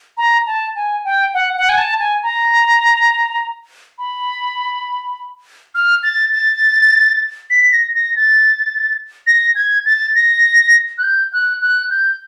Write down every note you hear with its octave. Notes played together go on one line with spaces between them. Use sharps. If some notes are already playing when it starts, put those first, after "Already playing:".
A#5
A5
G#5
G5
F#5
F#5
G#5
A5
G#5
A#5
B5
F6
A6
A6
B6
A#6
A#6
A6
A#6
G#6
A6
A#6
F#6
G6
F#6
F#6
G6